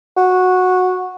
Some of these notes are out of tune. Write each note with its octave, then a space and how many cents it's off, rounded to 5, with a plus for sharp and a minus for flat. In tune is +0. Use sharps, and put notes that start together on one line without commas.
F#4 -10